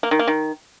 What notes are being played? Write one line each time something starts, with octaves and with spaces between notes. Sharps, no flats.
A#3
D#3
A#3
D#3